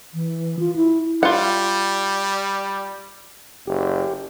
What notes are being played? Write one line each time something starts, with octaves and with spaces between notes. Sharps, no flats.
E3
F4
E4
G3 F4 F#5
F#1 G4